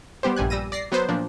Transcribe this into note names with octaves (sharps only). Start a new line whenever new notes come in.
G3 B3 G4 C5
A#1 G2 G3 G#5 F#6
G3 E6 A#6 D#7
D5 A#6 C7
F#3 B3 B4 C5
A#2 F3 D4